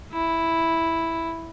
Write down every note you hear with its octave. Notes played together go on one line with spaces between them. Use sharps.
E4